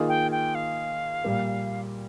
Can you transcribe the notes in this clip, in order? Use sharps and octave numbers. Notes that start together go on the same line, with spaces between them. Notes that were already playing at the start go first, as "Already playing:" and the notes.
Already playing: D#3 A#3 F4 G#4 D#5
G5
G5
F5
A#2 G3 A#3